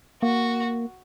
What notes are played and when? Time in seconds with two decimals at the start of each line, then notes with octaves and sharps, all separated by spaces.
0.22 A#3 F#4